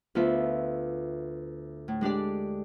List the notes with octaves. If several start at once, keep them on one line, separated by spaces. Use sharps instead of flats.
D2 B3 F4 E5
A2
G#3 D4 G4 D5